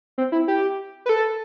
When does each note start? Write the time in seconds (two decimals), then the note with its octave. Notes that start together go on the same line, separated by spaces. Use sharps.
0.18 C4
0.32 E4
0.48 G4
1.06 B4
1.09 A4